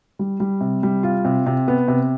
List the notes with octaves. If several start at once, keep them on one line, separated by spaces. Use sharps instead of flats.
G3
G3
C3
G3
F4
C3
C3
B3
C3